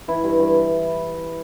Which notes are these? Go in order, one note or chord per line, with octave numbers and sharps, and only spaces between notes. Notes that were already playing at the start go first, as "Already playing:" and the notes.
E3 E4
G2
G2